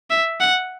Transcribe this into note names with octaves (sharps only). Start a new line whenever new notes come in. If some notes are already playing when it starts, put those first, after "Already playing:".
E5
F#5